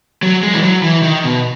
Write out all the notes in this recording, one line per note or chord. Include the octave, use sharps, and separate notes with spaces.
F#3
G#3
E3
F#3
E3
D#3
B2